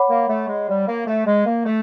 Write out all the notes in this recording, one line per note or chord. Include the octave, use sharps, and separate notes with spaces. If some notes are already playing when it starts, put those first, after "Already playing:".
Already playing: C#5 F#5 B5 D6
A#3
A3
G#3
G3
A#3
A3
G#3
A#3
A3